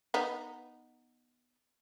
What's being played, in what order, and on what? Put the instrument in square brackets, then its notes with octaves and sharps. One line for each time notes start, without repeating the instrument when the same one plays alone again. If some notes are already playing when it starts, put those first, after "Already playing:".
[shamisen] B3 D#4